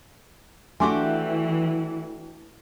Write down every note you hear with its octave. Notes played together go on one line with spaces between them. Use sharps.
E3 A3 D4 F#4 G4 G#5 C6 D6